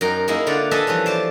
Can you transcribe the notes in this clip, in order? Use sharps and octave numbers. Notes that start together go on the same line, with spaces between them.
F#2 D#4 A#4 G5
G#3 A#3 D#4 E4
D3 F4 D5 F#5
G#4 A4 B4 D#5 E5 A5
E3 F3 G3 C#4
C5 D5 A5